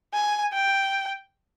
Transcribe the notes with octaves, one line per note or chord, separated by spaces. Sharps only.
G#5
G5